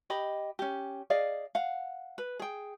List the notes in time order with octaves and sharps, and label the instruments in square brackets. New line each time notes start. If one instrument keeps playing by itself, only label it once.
[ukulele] G4 D#5 B5
C#4 G4
G#4 D5 D#5 F5
F5 F#5
B4
G#4 G5